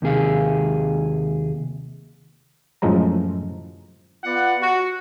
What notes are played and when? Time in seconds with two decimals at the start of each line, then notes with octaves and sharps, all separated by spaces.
0.02 D#2 C3 G#4 F5
2.82 F#2 A2 F3 G#3 C5 A#5
4.24 B3 F4 D5 F#5
4.61 F#4